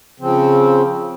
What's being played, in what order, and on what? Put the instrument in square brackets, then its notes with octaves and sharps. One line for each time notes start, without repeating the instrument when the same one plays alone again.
[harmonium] C#3 F3 C4